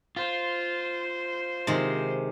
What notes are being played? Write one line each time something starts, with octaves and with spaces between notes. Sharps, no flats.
F4 C5
C3 D#3 G#3